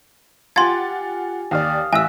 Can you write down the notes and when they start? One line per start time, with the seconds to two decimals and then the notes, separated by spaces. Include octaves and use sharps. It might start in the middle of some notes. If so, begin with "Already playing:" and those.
0.56 F4 G4 F#5 G#5 C6 G#6 A6
1.51 D#2 D5 F5 D#6 F6
1.93 A1 E5 G#5 E6 F#6 B6